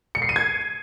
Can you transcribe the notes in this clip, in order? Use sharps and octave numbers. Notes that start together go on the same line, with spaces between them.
C#7
C7
D#7
G#6